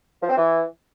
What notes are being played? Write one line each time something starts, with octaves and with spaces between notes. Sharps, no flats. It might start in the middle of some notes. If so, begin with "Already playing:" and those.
F3
C4
E3